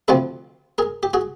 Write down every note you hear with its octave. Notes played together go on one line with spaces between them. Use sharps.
D2 C3 F3 A3 C4 A4 B4
G#4 A#4
G4
F#4 G#4